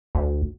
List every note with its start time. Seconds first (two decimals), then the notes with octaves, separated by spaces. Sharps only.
0.15 D2